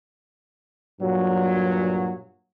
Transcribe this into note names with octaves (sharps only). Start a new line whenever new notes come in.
G2 A#2 F#3